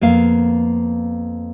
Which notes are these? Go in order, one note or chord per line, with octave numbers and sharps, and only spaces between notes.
F2 A#3 B3 F5